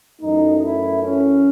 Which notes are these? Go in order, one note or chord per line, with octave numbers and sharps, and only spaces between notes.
F#2 E3 A3 D#4
E4
C#4